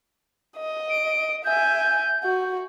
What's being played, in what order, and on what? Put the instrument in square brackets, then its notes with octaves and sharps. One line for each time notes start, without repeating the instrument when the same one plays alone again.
[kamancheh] D#5
[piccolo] D7
[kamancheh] E5 G#5 [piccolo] G6
[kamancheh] F#4